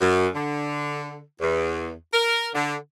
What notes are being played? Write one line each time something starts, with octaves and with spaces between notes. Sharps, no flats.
F#2
D3
E2
A#4
D3